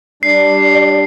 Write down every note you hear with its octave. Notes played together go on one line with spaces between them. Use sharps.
G3 D4 D5 C7